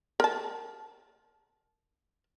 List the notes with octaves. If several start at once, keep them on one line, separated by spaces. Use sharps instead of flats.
A#4 A5